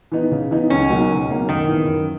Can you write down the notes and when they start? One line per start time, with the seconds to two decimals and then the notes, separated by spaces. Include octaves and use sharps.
0.12 E3 B3 D#4
0.31 C#3
0.51 E3 B3 D#4
0.70 C#2 C#4
0.90 B2 F#3 A#3 D#4
1.09 C#2
1.29 B2 F#3 A#3 D#4
1.49 F#2 D#3
1.68 C#3 E3 B3 E4
1.88 F#2